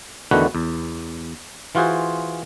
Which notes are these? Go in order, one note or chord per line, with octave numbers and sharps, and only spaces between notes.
E2 D3 D#3 A3 F#4 B4
E2
E3 F4 F#4 G#4 C5